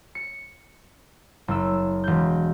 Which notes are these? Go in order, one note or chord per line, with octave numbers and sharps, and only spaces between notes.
C#7
F#1 E6
E1 G6